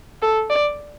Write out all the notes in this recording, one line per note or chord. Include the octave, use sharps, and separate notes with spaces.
A4
D5